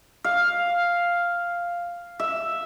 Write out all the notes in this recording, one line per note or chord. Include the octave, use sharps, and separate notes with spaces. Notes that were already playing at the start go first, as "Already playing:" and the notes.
F5
E5